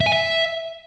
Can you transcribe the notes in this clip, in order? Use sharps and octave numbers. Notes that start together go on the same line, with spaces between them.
E5
G#5
E5